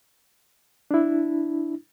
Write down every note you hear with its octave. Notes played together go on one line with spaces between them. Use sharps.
D4 E4